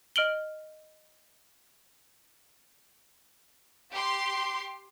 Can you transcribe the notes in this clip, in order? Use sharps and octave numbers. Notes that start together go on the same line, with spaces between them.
D#5 F6 D7 F#7 G7
G4 C6